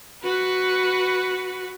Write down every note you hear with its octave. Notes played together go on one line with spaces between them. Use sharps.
F#4 B4